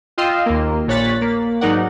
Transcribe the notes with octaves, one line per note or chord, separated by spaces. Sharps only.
F4 D#5 F5 G5 C6 E6
D#2 A#3
A#1 A#2 C#5 F#6 A6 B6
A#3
G#2 F#3 D#4 A#4 D5 F#5